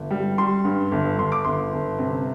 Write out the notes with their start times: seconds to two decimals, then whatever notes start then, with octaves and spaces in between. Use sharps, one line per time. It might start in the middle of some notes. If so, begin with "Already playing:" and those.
Already playing: G1
0.11 G3
0.38 G3 C6
0.65 G2
0.92 G1
1.18 G1 C6
1.32 D6
1.45 G1 C6
1.73 G1
1.99 C3